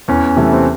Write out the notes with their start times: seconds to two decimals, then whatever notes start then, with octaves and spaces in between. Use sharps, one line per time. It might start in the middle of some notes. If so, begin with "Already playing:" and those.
0.08 E2 C#4
0.36 C3 E3 A3
0.53 C4